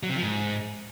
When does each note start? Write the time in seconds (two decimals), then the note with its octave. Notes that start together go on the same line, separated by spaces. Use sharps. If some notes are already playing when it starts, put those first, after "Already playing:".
0.03 F#3
0.10 C3
0.16 F3
0.23 G#2